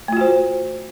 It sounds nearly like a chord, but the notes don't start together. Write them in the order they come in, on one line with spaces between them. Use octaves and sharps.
A3 F4 F#4 C5